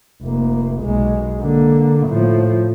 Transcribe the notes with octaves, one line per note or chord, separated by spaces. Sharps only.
F1 A#3
B1 G#3
D3 A#3
A2 F3